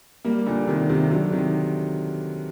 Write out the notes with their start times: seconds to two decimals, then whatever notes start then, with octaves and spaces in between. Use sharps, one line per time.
0.25 G3 A#3
0.47 A#2 D3
0.67 C3 D#3
0.89 C3 D#3
1.11 D3 F#3
1.32 C3 D#3